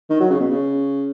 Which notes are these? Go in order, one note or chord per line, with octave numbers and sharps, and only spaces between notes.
D#3
F#3
C#3
B2
C#3